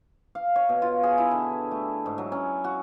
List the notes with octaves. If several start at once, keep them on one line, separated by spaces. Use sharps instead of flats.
F5
C#5
B2
F4
G#4
E4
D3
A3
G#2
F#3
C#4
F#4